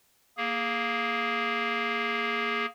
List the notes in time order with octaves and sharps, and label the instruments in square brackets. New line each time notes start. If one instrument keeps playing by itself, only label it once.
[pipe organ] A#3 G#4